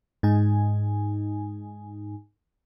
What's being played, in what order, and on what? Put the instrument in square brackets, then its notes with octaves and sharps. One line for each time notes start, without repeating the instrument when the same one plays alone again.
[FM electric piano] G#2 D#4 G#5